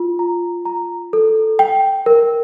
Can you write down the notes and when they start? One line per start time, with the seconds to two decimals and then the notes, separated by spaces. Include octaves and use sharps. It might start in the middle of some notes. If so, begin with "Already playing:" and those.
Already playing: F4
0.19 A#5
0.65 A#5
1.13 A4
1.59 G5
2.06 A#4